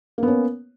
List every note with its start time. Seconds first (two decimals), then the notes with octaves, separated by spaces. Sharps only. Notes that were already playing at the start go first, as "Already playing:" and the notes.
0.18 A#3
0.23 B3
0.28 C#4